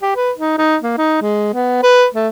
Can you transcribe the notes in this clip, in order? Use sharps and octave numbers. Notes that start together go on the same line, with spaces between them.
G4
B4
D#4
D#4
A#3
D#4
G#3
B3
B4
A3